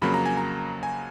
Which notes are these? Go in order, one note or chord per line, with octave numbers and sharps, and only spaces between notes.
F2 C#3 F#3 A#3 B5
A#5
G#5
A#5
G#5